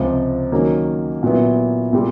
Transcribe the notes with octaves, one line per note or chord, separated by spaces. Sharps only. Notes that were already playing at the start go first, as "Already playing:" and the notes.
Already playing: C#2 C3 F3
D#3 F#3 A#3 C#4
A#2 F#3 B3 E4
A#2 G3